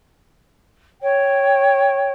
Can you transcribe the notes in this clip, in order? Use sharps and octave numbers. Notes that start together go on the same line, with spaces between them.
C#5 G5